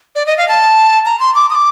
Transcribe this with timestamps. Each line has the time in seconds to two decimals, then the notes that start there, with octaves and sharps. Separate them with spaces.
0.15 D5
0.26 D#5
0.38 F5
0.48 A5
1.05 A#5
1.20 C6
1.35 D6
1.50 D#6
1.55 D6